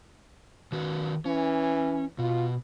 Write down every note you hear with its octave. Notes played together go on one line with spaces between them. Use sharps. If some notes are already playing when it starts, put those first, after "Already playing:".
D#3 F#4 B4
E3 C#4
B2 F4